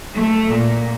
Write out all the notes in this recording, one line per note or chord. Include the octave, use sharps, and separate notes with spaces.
A3
A#2